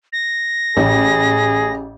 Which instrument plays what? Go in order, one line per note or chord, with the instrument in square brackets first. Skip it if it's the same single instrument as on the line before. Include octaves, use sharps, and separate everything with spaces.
[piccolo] A#6
[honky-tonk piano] A1 [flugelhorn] G#4